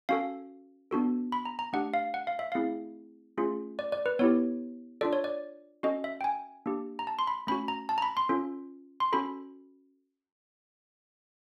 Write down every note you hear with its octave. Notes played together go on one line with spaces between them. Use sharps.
C#4 F#4 A4 F5
B3 D4 F#4 A4
B5
A#5
A#5
A3 D4 G4 F#5
F5
F#5
F5
E5
A3 C4 E4 G#4 F5
A3 C#4 F4 G#4
D5
D5
B4
B3 E4 G4 C#5
D4 F4 A4 D5
C#5
D5
C#4 F#4 A4 D#5
E5
G5
G#5
A#3 D4 G4
A#5
A5
C6
B5
A3 C#4 F#4 B5
A#5
A5
A#5
B5
C6
C#4 F4 A4
C6
C#4 F#4 A4 B5